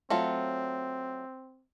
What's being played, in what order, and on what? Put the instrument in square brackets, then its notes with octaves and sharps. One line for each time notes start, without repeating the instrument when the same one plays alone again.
[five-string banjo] F#3 A3 F4 [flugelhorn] C4